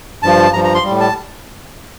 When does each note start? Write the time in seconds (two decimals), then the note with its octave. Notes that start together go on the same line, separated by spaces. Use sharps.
0.23 G2 F3 A5
0.53 G2 F3 A#5
0.64 A#5
0.74 C6
0.84 G3
0.89 A2
1.00 A5